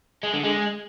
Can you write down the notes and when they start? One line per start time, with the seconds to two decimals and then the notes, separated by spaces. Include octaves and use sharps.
0.23 G#3
0.33 D3
0.44 G#3